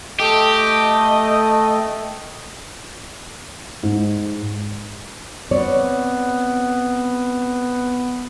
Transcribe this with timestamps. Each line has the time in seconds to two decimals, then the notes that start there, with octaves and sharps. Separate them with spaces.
0.20 A3 G4 D#5
3.83 G#2
5.51 B3 C4 C#5 D5